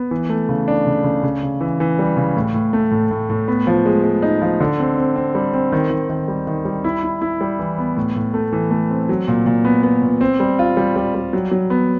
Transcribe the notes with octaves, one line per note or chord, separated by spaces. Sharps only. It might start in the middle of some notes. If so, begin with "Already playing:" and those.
Already playing: B3
E3
A3
C#3
D4
C#3
C#3
C#3
C#3
E3
E3
G3
C#3
A2
A2
A3
A2
A2
A2
B3
F3
G#3
G#3
D#4
F3
D3
C4
C4
C4
G3
C4
D#3
D#3
D#3
G3
D#3
G3
E4
E4
E4
G3
E3
B3
A2
A2
A3
E3
A3
C4
F#3
A#2
A#2
B3
B3
A#2
C4
G3
F4
G3
G3
G3
F#3
F#3
B3